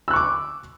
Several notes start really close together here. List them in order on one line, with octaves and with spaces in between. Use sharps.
E6 F#6 C#6 D6